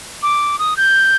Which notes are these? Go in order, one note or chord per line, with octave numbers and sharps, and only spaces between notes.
D6
D#6
G6